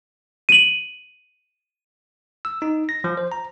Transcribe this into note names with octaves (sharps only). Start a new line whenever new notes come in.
D#7 F#7
E6
D#4
A#6
F3
C5
A#5